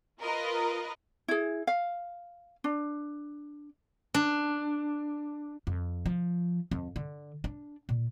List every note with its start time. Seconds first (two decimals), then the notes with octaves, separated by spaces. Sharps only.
0.22 F4 A#4 B4 D#5
1.28 E4 G#4
1.67 F5
2.64 D4
4.14 D4
5.67 F2
6.06 F3
6.71 F2
6.96 D3
7.44 D4
7.89 A#2